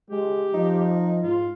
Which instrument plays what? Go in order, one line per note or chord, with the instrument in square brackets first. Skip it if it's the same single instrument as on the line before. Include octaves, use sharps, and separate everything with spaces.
[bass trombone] G#3 [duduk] G4
[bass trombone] F3 [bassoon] D#4
[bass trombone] G#2 [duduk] F4